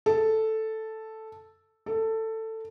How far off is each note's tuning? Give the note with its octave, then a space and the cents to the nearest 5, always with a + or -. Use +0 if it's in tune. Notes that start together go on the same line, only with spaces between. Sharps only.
A4 +0
A4 +15